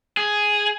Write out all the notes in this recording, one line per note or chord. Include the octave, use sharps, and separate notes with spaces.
G#4